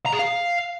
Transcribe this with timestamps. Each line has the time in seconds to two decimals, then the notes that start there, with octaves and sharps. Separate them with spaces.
0.06 A#5
0.12 G#4
0.19 F5